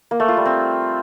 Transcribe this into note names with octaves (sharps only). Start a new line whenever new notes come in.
A#3
A3
F4
G3
C4